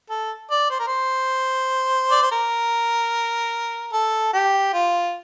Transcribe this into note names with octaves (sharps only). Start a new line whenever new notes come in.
A4
D5
C5
A#4
C5
D5
C5
A#4
A4
G4
F4